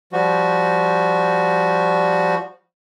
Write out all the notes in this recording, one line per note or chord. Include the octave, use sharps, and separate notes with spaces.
F3 G3 F#4